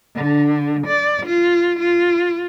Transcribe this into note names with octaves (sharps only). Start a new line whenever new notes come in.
D3
D5
F4
F4